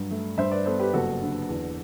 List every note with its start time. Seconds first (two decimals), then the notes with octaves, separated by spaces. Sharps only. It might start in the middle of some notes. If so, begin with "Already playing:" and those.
Already playing: G2 F#3
0.11 A3
0.38 G2 C5 E5
0.52 B4 D5
0.66 B3 A4 C5
0.79 G4 B4
0.93 F#1 F#4 A4
1.22 D3
1.49 E2